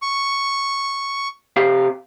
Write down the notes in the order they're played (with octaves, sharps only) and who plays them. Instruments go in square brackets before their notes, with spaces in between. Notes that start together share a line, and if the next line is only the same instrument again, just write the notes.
[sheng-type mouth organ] C#6
[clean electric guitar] C3 G4 F5